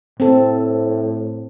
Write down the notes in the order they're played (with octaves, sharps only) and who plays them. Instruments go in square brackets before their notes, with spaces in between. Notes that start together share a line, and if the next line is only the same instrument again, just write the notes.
[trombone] A2 [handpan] C4 A4